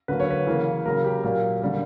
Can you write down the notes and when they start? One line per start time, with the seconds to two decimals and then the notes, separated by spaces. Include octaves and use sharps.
0.08 D3 F#3 A#3 B4
0.20 C#5
0.30 B4
0.46 C#3 E3 A#3
0.86 C#3 F#3 A#3 A#4
1.04 G4
1.23 A#2 F#3 A#3
1.61 D3 G3 A#3